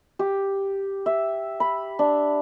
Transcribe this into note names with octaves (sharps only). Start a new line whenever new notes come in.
G4
E5
B5
D4